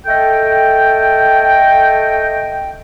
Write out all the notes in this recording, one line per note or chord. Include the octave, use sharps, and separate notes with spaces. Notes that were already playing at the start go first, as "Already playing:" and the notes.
A3 A4 D#5 G5